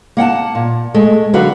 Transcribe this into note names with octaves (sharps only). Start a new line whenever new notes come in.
A#3 F#5 G5 A5
A#2
G#3 A3
D3 F#3 F#4 B4 F5